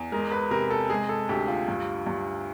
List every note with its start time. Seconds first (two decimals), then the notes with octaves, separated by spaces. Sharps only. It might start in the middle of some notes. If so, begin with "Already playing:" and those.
Already playing: E2
0.12 G#3 A#4
0.32 B4
0.51 C3 A#4
0.70 A4
0.90 G#3 G#4
1.09 A4
1.29 D2 G4
1.48 F4
1.68 G2
2.07 G2